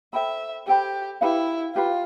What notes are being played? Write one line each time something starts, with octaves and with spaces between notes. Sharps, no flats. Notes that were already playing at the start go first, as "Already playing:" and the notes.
A4 C5 E5 G5 B5
G4 A4 C5 G5 B5
E4 G4 B4 F5 B5
F4 G4 B4 F5 B5